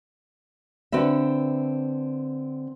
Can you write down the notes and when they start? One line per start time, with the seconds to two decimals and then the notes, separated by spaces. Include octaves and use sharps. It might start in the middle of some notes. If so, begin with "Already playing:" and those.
0.92 D3 C4 F#4 B4 E5